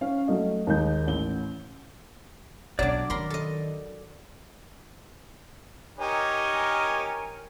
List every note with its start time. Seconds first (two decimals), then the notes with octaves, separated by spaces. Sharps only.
0.01 C#4 F5
0.27 F#3 A3 D#5 F5
0.67 D#2 G#3 D#4 G6
1.07 A1 G7
2.79 B1 F#3 D4 D5 D6
3.10 D#3 A#4 B5 C6
3.30 A4 D#5
5.99 D#4 G4 A#4 C#5 G#5